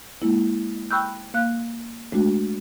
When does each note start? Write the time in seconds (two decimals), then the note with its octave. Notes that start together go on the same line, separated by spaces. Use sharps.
0.22 G#3 A#3 E4
0.91 G5 B5 C#6 E6 F#6 G6
1.34 A#3 F5 F#6
2.12 G#3 A3 D4 F#4